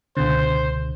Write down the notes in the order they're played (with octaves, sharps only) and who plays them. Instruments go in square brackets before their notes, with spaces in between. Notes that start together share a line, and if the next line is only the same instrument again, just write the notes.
[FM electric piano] C#2 B2 D3 [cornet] C5